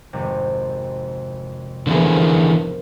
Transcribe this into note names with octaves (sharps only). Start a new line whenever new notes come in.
G#1 F2 C3
D3 E3 F3 B3 G#4 A#4